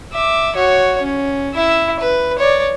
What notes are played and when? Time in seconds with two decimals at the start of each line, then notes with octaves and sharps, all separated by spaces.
0.13 E5 D6
0.56 F#4 C#5
1.02 C#4
1.54 E4 E5
1.99 B4
2.38 C#5 D5